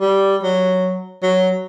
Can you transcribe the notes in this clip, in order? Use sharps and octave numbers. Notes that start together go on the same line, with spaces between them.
G3
F#3
F#3